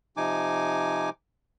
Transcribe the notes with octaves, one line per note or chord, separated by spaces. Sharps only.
C3 F3 D#4 G#5 D6